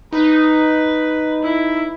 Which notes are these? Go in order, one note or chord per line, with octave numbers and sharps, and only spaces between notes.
D#4 B4
E4